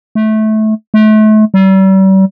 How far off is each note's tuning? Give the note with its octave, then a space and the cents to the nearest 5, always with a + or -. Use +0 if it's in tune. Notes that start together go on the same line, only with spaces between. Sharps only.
A3 -20
A3 -35
G3 -40